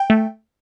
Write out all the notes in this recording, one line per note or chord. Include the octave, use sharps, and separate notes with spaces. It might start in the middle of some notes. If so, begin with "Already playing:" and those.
Already playing: G5
A3